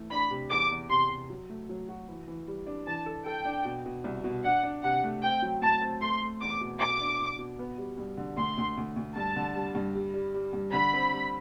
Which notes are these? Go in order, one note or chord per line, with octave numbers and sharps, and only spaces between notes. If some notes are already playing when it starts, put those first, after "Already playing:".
Already playing: E3 A3
D4 B5
C3
E2 D6
E2
C3 C6
C3
F#3
A3
F#3
F#4
E3
E3
G3
D4
E3 A5
A4
A4 G5
D4
B2
B2
C2
B2
D4 F#5
D4
C3 F#5
A3
C4 G5
F#3
A2 A5
C4
A3 C6
A3
E2 D6
B2
B2 D6
D4
B2
B2
B3
G3
G2
D3
D2 C6
D2
D2
D2
G2 A5
D3
G3
G2
G3
G3
G3
G2
D3 B5
C4
G3